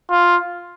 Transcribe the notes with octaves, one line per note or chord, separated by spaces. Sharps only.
F4